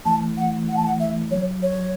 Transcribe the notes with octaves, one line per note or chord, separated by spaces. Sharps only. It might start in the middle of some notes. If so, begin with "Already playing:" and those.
E3 A3 A5
F#5
F#5
A5
F#5
E5
F#3 C#5
C#5